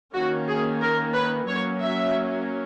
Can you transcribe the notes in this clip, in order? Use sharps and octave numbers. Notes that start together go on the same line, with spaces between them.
D#3 A#3 C#4 F#4
G#4
A#4
B4
F#3 A#3 C#4 C#5
E5